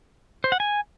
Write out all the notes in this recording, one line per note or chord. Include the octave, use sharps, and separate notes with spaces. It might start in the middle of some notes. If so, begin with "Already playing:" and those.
C5
F#5
G#5